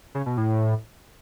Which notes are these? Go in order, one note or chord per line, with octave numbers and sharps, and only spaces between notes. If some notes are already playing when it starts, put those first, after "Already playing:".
C#3
B2
A2